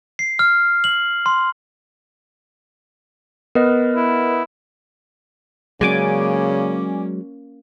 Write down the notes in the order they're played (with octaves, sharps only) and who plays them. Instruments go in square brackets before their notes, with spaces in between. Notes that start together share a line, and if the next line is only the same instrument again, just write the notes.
[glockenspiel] C7
F6
F#7
C6
[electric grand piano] B3 [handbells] A#4 B4 D#5
[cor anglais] E4
[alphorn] C#3 [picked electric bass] F#3 G#3 [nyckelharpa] A#3 C#4 [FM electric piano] D5 G#5 D6